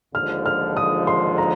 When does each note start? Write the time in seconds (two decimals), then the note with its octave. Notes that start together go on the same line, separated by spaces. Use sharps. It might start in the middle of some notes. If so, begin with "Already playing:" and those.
0.14 D#2 D3 F3 G#3 F6
0.46 F6
0.77 D#6
1.07 C6
1.38 A#5